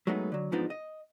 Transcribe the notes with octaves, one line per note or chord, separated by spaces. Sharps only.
F#3 G#3 A3 B3 D#4
D3 F#3
E2 G#2 F3 B3 D4 D#4
D#5